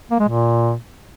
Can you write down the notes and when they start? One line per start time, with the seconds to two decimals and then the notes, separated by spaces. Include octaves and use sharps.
0.11 A#3
0.20 G#3
0.28 A#2